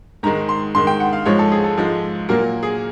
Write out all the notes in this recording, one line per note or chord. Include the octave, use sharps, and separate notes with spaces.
G#2 D#3 G#3 A#5
C6
G#2 D#3 G#3 C6
G5
F#5
F5
G#2 F3 G#3 C#5
A4
G#4
A4
G#2 F3 G#3
A#2 F#3 A#3 A#4
G#4